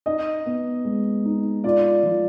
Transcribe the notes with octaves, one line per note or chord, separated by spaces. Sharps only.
D#4 D#5
B3
G#3
D#4
F4 D5
F3